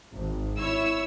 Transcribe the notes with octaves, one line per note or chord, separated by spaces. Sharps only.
G#1
E4 C#5 E6